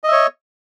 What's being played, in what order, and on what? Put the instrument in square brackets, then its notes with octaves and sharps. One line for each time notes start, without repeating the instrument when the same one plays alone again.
[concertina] D#5
E5
C#5